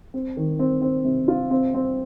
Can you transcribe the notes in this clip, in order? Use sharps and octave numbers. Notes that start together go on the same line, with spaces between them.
C4
D#3
C4
C4
C3
F4
C4
C4